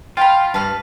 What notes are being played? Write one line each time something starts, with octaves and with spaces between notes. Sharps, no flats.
F4 F5 G5 B5
G2 B4 A5 F6